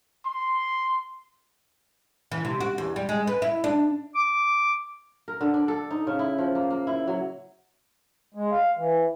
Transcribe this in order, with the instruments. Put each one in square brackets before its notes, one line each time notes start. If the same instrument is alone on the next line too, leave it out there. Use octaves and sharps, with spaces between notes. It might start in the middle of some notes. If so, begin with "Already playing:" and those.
[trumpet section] C6
[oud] E3
C3
F#4
E2
G3
G#3
B4
E4
D4
[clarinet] D6
[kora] A#4
D3
D4
A4
D#4
C#3
E4
F3
A#3
A#3
E4
F#3
[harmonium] G#3
F5
E3